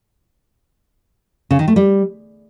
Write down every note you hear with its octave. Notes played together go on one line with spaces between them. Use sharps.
C#3
D#3
A3
G3